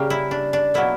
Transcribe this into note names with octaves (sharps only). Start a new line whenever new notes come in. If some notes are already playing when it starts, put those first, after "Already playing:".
Already playing: C#3 G3 A#3 G4
E4
D4
D4
B2 F#3 A#3 E4